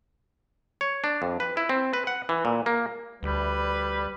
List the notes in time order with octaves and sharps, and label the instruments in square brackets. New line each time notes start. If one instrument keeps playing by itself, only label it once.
[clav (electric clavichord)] C#5
D4
F2
B4
E4
C4
B4
F#5
E3
A#2
A#3
[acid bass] D2 [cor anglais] G3 [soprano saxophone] B4